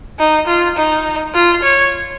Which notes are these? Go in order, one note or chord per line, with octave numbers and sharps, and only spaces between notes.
D#4
F4
D#4
F4
C#5